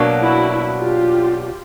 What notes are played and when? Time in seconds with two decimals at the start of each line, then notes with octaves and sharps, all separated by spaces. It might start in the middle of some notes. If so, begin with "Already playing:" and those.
Already playing: B2 F#3 A#3 D4
0.21 E4 F#4
0.79 F4 G4